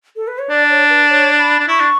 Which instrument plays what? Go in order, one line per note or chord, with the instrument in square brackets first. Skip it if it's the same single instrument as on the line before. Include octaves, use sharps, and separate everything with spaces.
[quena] A4
B4
C#5
[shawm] D4 [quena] D5
[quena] C#5
B4
C#5
B5
[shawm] D4
[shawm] E4 [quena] C#6
[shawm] D4